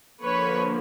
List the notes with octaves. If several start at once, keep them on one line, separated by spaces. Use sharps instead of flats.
D3 F3 A#3 B4 C#5